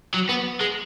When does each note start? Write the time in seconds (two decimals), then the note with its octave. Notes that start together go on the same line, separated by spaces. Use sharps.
0.14 F#3
0.29 B3
0.61 G#3